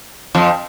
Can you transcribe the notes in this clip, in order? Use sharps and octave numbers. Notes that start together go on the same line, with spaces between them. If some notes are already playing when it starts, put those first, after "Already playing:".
F2 F3